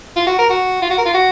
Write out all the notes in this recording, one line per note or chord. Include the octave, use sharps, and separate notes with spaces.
F4
F#4
A#4
F#4
F4
F#4
A#4
F4
F#4